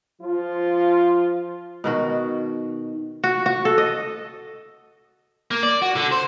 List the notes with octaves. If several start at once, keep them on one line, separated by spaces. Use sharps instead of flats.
F3 F4
B2 D#3 F#4
F#4
F#4
A4
D#5
A#3
D5
F#4
D3
C5